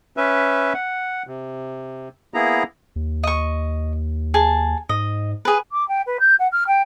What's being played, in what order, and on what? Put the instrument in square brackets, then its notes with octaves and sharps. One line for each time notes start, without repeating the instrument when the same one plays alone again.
[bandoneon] C#4 B4 E5
F#5
C3
A#3 B3 E4 G#4 A#5
[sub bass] D#2
[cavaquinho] D#5 C#6
G#4 A5
[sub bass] G#2 [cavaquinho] D#5
[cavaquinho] G#4 B4
[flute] D6
G5
B4
G6
F#5
F6
G5